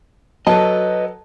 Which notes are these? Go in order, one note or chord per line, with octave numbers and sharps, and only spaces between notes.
F#3 A4 B4 D#5 A5